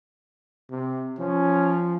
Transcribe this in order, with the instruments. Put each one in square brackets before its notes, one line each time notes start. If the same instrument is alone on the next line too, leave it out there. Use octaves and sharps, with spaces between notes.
[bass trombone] C3
[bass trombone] F3 [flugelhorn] C#4